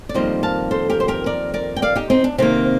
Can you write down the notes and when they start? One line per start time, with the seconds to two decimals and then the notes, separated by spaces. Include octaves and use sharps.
0.09 D5
0.14 F2 D#3 G3 A#3 C5 D#5
0.43 F5 A5
0.71 A4 C5
0.90 G4 A#4
1.00 C5
1.08 G4 A#4
1.26 A#4 D5
1.54 A#4 D5
1.76 G5
1.82 D5 F5
1.95 D#4 G4
2.10 C4 D#4
2.24 D4
2.38 C3 D#3 A#3 C4